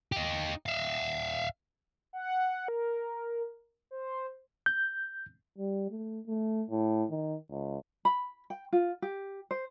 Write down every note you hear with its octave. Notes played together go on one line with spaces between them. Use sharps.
D#4 G4
E5 F5
F#5
A#4
C5
G6
G3
A3
A3
A2
D#3
C#2
B5
G5
F4
G4
C5